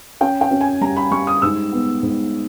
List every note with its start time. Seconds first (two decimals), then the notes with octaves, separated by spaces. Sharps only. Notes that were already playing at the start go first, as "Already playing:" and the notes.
0.21 C#4 G5
0.41 G5
0.51 C#4
0.61 G#5
0.81 G3 A#5
0.96 B5
1.11 G3 C#6
1.27 D#6
1.42 G#2 E6
1.72 B3
2.03 G#2